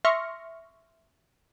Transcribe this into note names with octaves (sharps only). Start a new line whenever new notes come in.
E5 C6 C#6 F6 A#6 C#7